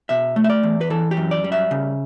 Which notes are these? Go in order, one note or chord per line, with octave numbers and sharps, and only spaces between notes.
B2 E5
A3
E5
D5
E2
B4
E3 A4
G4
F#2
D5
G3
E5
C#3